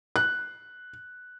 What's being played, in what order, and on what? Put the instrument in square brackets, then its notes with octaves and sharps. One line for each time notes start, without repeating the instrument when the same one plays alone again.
[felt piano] F#6